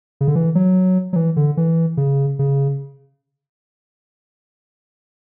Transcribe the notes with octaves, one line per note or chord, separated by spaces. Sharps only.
C#3
D3
E3
F#3
F#3
E3
D3
E3
C#3
C#3